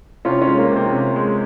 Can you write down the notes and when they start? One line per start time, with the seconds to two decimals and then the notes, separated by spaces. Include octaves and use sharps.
0.25 C3 C#4 F4
0.41 C#4 F4
0.47 G#3
0.59 A#3
0.71 C3
0.76 C4
0.93 C3
1.16 G#3